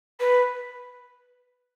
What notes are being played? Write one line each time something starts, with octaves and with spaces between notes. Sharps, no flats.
B4